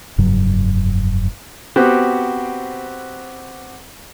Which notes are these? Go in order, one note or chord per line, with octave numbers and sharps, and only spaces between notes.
F1 G2 C#3 F#3
B3 C4 F#4 G4